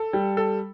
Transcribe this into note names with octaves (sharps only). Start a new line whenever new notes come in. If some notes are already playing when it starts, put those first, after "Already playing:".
Already playing: A4
G3
A4